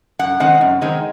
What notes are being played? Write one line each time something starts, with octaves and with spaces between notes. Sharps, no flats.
F#2 F#5
D#3 G#3 C4 D#4 F#5
F#2
D#3 G#3 C4 D#4